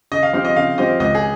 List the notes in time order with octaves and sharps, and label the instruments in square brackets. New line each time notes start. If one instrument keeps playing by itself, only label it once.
[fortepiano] C#3 [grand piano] D#5
[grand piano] F5
[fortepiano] F3 C4 G4 [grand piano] F5
[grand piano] D#5
[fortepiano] C#3 [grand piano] F5
[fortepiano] F3 C4 G4 [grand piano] D#5
[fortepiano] C#2 [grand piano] D#5
[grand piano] G#4